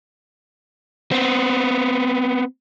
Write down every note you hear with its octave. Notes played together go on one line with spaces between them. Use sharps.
B3 C4